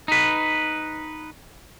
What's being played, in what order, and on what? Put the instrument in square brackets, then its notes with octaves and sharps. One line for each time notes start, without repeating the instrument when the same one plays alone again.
[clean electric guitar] D#4 B4